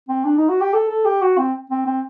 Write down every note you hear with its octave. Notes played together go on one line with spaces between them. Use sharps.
C4
D4
D#4
F#4
G4
A4
A4
G4
F#4
C4
C4
C4